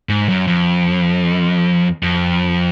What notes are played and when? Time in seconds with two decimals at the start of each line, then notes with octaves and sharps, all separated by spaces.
0.09 G#2
0.29 F#2
0.47 F2
2.03 F2